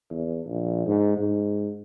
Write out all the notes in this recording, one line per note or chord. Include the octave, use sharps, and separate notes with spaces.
E2
A#1
G#2
G#2